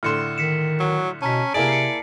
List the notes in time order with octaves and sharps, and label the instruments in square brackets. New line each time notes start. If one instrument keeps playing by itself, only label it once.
[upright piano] A2 D3 C6 [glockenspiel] F6 C#7 E7
[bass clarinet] D#3 [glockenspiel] B6 C#7 E7
[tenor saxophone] F#3
[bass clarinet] B2 [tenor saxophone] C#4 [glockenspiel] A5 A#5 B6
[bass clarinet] C3 [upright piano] A#3 E4 G#4 [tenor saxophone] D5 [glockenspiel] D7
[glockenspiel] C7 C#7